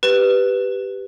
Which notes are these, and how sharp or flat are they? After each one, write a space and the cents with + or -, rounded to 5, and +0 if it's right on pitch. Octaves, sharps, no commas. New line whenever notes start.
G4 +0 B4 +5